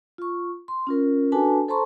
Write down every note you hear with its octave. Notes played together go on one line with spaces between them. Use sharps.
F4 C#6
C6
C#4 F4 A#4
D4 F#4 A4 B4 G#5 A5
A4 C5 A5 A#5 C6 C#6